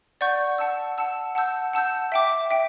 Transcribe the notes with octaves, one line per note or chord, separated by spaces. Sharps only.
D5 F#5 C#6 G6
F#5 A5 E6
F#5 A5 E6
F#5 A5 E6 G6
F#5 A5 E6 G6
E5 G5 D6
E5 G5